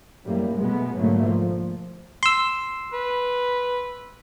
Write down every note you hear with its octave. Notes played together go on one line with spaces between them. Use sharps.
F#2 A2 G3 A3 A#3
B2 G#3 A3 B3
G#2 B2 D3 F#3 A3 A#3
F3
C6 E6
B4